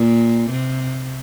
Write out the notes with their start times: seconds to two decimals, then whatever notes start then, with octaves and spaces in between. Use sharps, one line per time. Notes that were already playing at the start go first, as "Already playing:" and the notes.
Already playing: A#2
0.50 C3